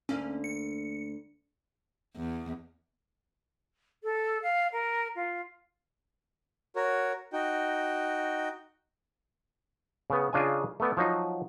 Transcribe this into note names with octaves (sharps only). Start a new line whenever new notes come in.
D2 A#3 C#4
C#7
E2
A4
F5
A#4
F4
F#4 A#4 C#5
D#4 F#4 G5
C#3 B3
C#3 D4 F4 D#5 G#5
A3 B3 D5
F3 F#3 D#4